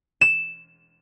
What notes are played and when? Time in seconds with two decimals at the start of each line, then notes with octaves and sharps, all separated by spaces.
0.21 E7